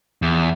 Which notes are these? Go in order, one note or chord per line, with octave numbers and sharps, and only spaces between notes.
E2